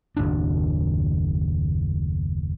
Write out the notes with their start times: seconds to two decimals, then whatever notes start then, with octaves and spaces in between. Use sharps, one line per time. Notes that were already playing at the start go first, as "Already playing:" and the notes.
0.17 F#1 D#2 A2 D4